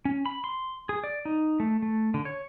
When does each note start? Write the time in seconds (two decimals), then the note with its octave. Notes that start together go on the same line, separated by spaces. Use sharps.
0.05 C#4
0.26 B5
0.44 C6
0.89 G#4
1.04 D5
1.25 D#4
1.60 A3
1.82 A3
2.14 D3
2.25 C#5